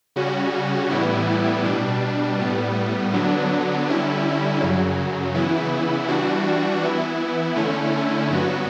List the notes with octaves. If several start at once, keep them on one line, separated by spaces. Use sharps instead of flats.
C#3 G3 C#4 F#4
A2 E3 G3 B3 E4
B2 G3 D4
A2 G3 B3
D3 F#3 B3 D4
D3 G3 C#4 E4
F#2 C#3 F#3
C#3 E3 B3 E4
E3 G3 D4 F#4
E3 B3 E4
D3 A3 C#4 E4
G2 F#3 B3 F#4